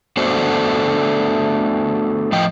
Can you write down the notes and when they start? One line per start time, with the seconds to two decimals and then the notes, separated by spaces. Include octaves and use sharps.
0.17 A3 B3 D4 F#4 A4 C5
2.32 A2 F3 D#5 G5